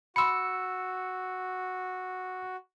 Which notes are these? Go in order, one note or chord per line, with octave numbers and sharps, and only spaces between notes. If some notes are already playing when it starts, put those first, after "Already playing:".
F#4 B5 C6 E6 C#7